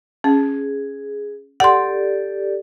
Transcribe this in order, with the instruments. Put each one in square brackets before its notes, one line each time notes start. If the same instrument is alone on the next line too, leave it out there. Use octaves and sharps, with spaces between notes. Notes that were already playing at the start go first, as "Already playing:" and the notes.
[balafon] C#4 [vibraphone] G#4
[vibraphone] G4 A4 D5 [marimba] F#5 C6